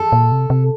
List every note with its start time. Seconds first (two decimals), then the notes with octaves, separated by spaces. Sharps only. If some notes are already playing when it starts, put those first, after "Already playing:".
Already playing: A4
0.12 A#2
0.32 C3
0.50 C3